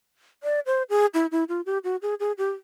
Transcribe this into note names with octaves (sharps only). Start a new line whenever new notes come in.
D5
C5
G#4
E4
E4
F4
G4
F#4
G#4
G#4
G4